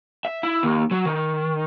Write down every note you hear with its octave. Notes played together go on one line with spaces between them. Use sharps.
E5
E4
D#2
F#3
D#3